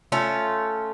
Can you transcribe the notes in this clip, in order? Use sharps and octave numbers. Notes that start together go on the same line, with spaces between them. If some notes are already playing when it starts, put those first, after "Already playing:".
A3 C#4 F4